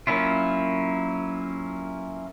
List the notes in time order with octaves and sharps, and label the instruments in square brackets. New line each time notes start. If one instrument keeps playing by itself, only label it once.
[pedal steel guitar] F#3 A#3 C#4 E4 F4